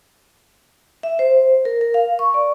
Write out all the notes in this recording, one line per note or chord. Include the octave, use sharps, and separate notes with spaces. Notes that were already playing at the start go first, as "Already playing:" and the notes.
E5
C5
A#4
A#4
F5
C#6
D5